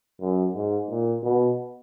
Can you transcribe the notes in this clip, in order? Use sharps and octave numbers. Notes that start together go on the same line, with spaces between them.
F#2
G#2
A#2
B2